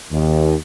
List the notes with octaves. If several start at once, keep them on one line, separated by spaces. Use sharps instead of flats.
D#2